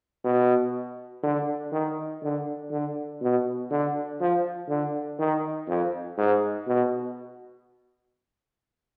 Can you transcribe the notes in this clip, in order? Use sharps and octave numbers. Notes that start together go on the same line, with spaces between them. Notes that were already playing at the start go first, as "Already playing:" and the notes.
B2
D3
D#3
D3
D3
B2
D3
F3
D3
D#3
F2
G#2
B2